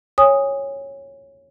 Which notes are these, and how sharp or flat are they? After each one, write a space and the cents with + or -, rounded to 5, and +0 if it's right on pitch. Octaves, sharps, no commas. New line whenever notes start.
C#5 -5 G#5 -25 D#6 +0